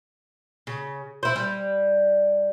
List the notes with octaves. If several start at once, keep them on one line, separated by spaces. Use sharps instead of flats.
C#3
E4 C5
G3